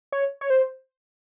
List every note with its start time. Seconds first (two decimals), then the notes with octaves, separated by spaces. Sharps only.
0.12 C#5
0.41 C#5
0.50 C5